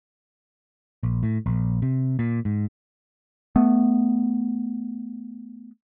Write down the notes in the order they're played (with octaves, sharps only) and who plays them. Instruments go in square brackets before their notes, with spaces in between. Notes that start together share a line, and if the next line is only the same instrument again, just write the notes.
[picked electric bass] A#1
A2
A#1
C3
A#2
G#2
A3 B3